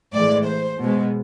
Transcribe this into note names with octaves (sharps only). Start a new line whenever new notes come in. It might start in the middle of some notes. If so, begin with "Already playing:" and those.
A2 E3 G#3 D5
C5
B2 G#3